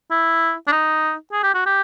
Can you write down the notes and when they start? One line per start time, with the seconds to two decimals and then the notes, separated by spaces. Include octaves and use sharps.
0.11 E4
0.68 D4
0.72 D#4
1.32 G#4
1.43 G4
1.54 F#4
1.66 G4